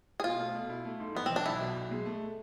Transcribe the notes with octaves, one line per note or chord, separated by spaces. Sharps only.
G#4
B2 F4
A3
B2
E4
A3
G#2
A1 B3
E3 C4
D4
B1 E4
B2
B1
G#3
A3